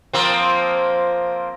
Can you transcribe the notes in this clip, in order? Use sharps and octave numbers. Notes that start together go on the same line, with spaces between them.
F3 A#3 C4